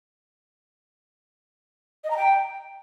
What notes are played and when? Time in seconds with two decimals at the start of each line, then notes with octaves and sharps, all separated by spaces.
2.04 D#5
2.11 A#5
2.17 G5